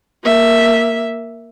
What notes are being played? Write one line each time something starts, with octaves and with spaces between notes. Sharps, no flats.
A#3 E5